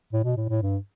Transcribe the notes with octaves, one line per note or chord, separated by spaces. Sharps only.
A2
B2
A2
A2
G2